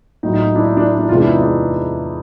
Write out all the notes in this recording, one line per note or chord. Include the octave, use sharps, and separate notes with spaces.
A2 F#3 D#4
D#4
D#4
D4 E4
D#4
D4 E4
D4
D4 E4
E2 C3 E3 G#3 D#4 F4
D4 E4
D#4
D4 E4